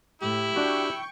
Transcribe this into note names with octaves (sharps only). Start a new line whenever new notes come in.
A2 E4 G4
D4 F#4 G5 C#6